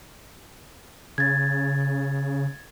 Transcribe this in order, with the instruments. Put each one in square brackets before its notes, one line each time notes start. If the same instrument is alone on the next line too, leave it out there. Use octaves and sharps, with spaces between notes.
[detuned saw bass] C#3 [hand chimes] G#6 A6